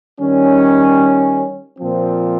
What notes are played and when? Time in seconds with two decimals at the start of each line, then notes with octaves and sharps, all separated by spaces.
0.19 D#3 G3 C#4
1.78 A#2 F3 C4